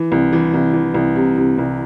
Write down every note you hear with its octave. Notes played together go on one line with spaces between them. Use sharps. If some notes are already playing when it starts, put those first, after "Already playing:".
Already playing: E3
C2
E3
C2
E3
C2
C3
C3
C2